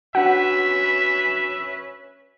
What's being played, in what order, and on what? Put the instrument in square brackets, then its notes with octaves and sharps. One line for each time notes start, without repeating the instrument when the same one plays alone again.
[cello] C#4 B4 [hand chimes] D4 F#4 [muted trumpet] E5 [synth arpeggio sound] F#5